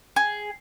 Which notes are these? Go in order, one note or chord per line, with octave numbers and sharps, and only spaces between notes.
G#4